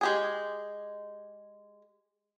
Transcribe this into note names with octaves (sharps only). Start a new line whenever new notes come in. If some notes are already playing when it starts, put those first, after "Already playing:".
G#3 G4 G#4